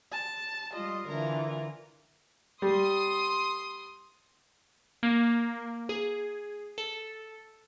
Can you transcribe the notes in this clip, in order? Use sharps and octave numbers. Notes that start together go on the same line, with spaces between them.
A5
G3 F4 D#5
D3 E3 F4 A#4
G3 C6 D#6
A#3
G#4
A4